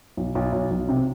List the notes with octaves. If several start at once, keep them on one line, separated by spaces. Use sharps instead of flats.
B1
B1
B1
B1
C3